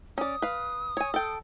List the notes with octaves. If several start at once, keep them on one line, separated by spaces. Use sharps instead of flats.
C#4 D5 D#6
B4 F5
C#5 G#5
A4 G5